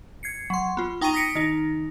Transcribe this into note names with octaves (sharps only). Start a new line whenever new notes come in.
G#6 C7 C#7
F#3 C6
B3 F4
D#4 G5 A#5 C#6 A#6 D#7
D#6 A#6 B6 C#7 D7
D#3 D#4